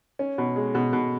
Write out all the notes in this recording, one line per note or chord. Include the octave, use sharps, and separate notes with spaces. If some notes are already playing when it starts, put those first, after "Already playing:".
C#4
B2
G#3
B2
B2